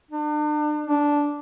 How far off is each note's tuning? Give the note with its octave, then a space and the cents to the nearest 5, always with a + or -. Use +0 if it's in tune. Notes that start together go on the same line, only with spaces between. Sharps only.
D4 +40
D4 -5